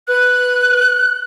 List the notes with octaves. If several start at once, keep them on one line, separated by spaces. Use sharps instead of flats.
B4 F#6